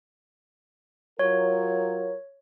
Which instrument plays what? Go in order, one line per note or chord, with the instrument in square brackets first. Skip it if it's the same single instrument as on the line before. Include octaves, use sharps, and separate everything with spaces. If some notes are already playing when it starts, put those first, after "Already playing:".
[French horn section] F#3 F4 A#4 [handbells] C#5